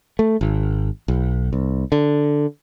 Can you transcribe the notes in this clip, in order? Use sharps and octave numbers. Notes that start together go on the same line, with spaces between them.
A3
G#1
B1
C2
D3